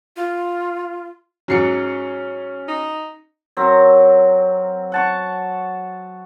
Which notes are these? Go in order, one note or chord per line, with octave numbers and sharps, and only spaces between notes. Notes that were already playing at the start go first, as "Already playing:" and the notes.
F4
G#2 F#3 C#4 C7 C#7
D#4
F#3 C4 A#4 A#5
F#5 A5 C#6